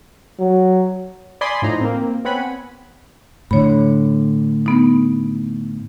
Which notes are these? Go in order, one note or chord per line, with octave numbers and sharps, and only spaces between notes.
F#3
D5 G#5 B5 C6 D#6
A2 F3 D#4 A#5
A#3 C4
B3 C4 C#5 F#5 G#5 B5
A2 D3 C#5 B5
B3 D#4